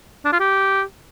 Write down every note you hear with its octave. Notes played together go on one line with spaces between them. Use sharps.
D4
F4
G4